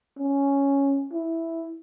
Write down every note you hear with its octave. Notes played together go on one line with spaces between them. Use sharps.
C#4
E4